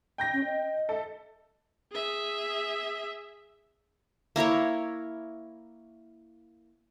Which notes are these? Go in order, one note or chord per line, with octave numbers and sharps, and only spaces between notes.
G5 G6 A#6
C#4
D#5
A4 E5
G#4 E5
A#3 E4 A#4 C#5